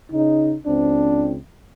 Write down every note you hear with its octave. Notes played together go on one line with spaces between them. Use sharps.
C#3 D#4
C#2 C4 D4